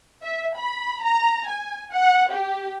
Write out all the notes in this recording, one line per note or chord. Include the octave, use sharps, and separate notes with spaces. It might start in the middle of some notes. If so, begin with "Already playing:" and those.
E5
B5
A#5
G#5
F#5
G4